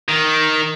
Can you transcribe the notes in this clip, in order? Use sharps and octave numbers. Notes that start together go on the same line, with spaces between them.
D#3